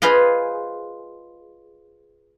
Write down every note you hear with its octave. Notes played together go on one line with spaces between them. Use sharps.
F4 G#4 B4 C5 D#5 F5